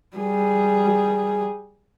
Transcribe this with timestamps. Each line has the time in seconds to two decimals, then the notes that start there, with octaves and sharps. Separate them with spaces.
0.17 G3 G#4